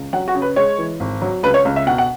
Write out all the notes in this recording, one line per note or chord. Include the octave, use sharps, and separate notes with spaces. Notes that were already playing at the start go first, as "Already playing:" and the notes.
Already playing: C#2
F#3 F#5
F#4
C#3
B4
G#3 C#5
E3
G#1
F#3
C#2 B4
C#5
C#2
E5
B2 F#5
F#5